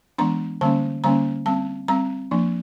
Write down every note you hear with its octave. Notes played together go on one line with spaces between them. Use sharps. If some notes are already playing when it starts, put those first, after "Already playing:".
E3 G#3 B3 D4 A#5
D3 G3 A#3 C#4 A5
D3 G3 A#3 C#4 A#5
G3 C4 A5
G3 C4 A#5
F3 A#3 D4